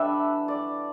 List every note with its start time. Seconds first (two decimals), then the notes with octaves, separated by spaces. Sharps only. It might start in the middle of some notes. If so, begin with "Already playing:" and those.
Already playing: E3 G3 D4 E5 F#5
0.48 D5